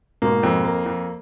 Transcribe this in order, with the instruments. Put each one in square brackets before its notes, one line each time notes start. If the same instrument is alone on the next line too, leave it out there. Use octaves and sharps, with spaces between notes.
[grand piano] G#2 B2 [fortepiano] A#3
[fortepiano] F2
A#3
F2